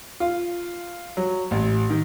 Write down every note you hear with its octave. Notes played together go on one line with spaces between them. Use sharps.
F4
F#3
A1
D#3